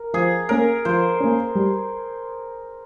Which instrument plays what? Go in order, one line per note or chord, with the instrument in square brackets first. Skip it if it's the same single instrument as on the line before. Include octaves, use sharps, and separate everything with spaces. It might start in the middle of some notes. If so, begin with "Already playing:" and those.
Already playing: [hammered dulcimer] A#4
[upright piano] F3 [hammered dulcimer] G#4
[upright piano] A#3 C#4 [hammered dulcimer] A#4
[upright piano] F3 [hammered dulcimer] C5
[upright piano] A#3 C#4
G3